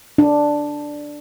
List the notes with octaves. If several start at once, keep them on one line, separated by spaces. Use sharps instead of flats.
D4